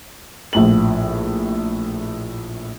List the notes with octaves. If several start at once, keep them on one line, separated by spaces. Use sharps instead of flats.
A#1 A2 F#7